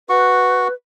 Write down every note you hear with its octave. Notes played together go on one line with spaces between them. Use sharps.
F#4 B4 C#6